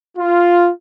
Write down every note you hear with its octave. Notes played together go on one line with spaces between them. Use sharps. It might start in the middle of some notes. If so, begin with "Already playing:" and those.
F4